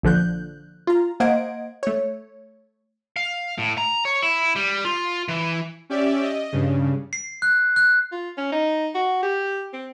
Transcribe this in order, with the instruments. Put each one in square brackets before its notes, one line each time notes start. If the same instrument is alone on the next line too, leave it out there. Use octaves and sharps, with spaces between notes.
[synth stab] A#1 D3 F3 F#6 G6
F4 A#5
A#3 C5 D#5 F#5 G#6 D7
A3 C#5
[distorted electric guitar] F5
A2
A#5
C#5
E4
G3
F4
E3
[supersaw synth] C#4 G4 D5 E5
D#5
G2 C#3
[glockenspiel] C7
F#6
F#6
[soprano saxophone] F4
C#4
D#4
F#4
G4
C4